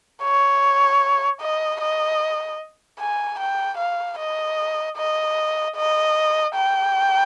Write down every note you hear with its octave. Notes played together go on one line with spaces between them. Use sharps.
C#5
D#5
D#5
G#5
G5
F5
D#5
D#5
D#5
G5